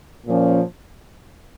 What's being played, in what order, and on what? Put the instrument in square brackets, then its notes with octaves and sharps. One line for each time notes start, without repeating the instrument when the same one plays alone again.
[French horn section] A#2 F3 C#4